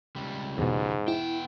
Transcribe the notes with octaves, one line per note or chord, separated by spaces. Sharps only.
C#2 G3
E2 G#2 B2
B3 E4 G5